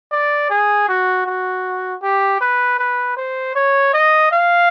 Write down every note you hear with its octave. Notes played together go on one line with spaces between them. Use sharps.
D5
G#4
F#4
F#4
G4
B4
B4
C5
C#5
D#5
F5